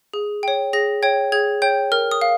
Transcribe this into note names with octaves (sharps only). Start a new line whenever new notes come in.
G#4
C#5 G5
G#4 A#6
C#5 G5 G#6
G#4 G#6
C#5 G5 G6
A#4 F6
D#6
F5